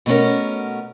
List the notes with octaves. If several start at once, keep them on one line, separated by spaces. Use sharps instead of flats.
B2 A3 B3 C#4 A#4